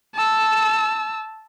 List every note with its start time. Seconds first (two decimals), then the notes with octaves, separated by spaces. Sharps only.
0.15 A5 E6